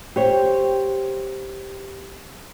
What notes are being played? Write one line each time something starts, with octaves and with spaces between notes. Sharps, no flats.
G4 C5 C#5